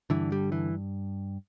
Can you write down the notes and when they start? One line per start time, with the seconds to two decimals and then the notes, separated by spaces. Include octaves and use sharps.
0.10 G2 D3 E3
0.32 G3
0.52 E3